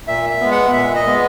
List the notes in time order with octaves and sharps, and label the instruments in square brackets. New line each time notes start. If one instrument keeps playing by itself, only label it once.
[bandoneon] A#2 E5
E5
G#3 B3
F#5
A#2 E5
D#5
G#3 B3